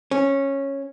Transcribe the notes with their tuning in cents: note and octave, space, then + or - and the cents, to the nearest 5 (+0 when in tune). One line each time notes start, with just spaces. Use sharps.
C#4 -10